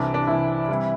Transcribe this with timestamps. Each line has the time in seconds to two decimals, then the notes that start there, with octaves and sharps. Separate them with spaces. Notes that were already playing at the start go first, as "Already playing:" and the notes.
Already playing: C2 C3 E3 D4
0.14 D4
0.27 C2 C3 E3 E4
0.68 C3 E3 G3